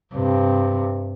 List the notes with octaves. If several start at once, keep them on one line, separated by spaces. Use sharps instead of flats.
G2 C3